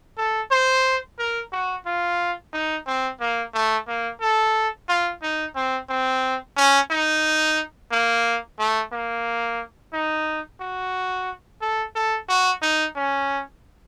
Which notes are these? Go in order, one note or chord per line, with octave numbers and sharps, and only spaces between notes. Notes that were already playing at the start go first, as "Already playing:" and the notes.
A4
C5
A#4
F#4
F4
D#4
C4
A#3
A3
A#3
A4
F4
D#4
C4
C4
C#4
D#4
A#3
A3
A#3
D#4
F#4
A4
A4
F#4
D#4
C#4